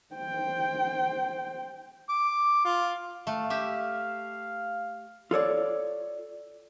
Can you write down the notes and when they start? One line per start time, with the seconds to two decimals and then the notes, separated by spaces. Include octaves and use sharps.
0.15 C5 G5
2.09 D6
2.65 F4
3.27 A3 F5
3.50 G4 E5
5.31 F4 A4 C#5 D5